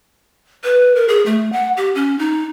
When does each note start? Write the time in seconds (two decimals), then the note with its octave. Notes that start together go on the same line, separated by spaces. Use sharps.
0.64 B4
0.96 A#4
1.08 G#4
1.26 A3
1.52 F#5
1.77 G4
1.95 C#4
2.19 D#4